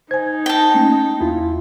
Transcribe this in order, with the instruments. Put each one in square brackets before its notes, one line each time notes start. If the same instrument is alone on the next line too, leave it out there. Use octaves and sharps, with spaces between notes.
[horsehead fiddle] D#4 [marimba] C5 G#5 [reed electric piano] G#6
[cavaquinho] G5 A5
[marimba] A3 A#3 C#4
[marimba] E2 [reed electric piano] E4 F4